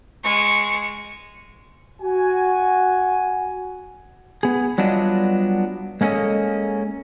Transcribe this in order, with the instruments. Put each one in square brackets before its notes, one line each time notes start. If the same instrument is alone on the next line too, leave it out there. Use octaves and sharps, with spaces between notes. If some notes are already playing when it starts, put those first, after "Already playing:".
[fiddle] G#3 C#6
[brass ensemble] F#4 G#5
[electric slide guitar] B3 G#4
F#3 G3 B3 D4 F4 D#5
G#3 A#3 C#4 A4 D#5